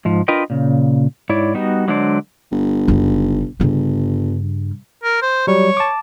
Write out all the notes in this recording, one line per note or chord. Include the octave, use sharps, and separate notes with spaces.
G#2 F3
D4 F4 A#4 B4 D#5 G5
A#2 C#3
G#2 E4 C#5 D5
G3 B3 D#4 F#4
D3 F#3 G#3 D4 C5 D5
G1
F#1 D#4
G1 G2 C#3
A#4
C5
F#3 G3 C#5
A5 D6